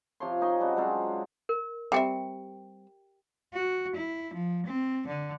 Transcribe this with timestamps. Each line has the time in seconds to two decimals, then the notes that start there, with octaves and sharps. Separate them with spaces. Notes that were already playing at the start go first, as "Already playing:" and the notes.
0.20 C3 F3 C#5 C6
0.41 D#4 D#5 G#5 C#6
0.60 C#3 G3 D4 F#4
0.76 F#3 G#3 C4 F4
1.49 A#4
1.92 G3 C4 G4 E5 G5
3.54 F#4
3.95 E4
4.34 F3
4.66 C4
5.07 D3